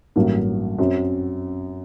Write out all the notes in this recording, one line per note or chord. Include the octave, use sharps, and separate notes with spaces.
A1 G2 F#3 A#3
F#2 F#3 C4